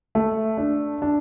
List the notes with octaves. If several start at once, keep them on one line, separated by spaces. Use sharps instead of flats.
A3
D4
D4